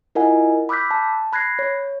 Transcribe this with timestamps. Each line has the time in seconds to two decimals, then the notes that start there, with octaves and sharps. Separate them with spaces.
0.15 E4 F4 A#4 D#5 F#5 G#5
0.69 B5 D6 E6 F#6 G6 B6
0.91 A5
1.33 B5 F#6 G#6 A#6 C7
1.59 C#5